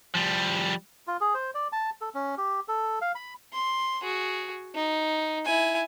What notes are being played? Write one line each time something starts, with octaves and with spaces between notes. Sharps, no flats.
F3 G3
F4
G#4
C5
D5
A5
A4
C#4
G4
A4
F5
B5
C6
F#4 G#4
D#4
E4 G#5